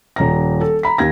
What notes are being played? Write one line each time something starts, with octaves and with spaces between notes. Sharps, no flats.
D#1 A#5 A#6
A4
A#5 B5 B6
D#2 G#6 A#6